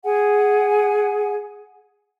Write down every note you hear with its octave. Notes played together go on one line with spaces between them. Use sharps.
G#4 F#5 G#5